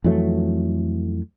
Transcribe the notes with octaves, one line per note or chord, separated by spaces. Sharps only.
F2 E3 F#3 A3